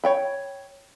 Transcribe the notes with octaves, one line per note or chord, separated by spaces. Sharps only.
C#5 G5 B5